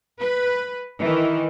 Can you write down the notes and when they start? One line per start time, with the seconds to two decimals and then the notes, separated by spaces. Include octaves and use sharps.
0.20 B4
0.99 D#3 E3